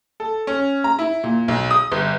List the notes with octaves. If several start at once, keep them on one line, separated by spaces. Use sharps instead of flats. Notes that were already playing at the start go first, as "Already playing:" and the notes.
A4
C#4
A#5
E4
A#2
B1
D#6
G1